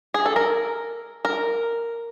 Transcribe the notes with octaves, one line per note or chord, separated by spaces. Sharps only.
G#4
A4
A#4
A#4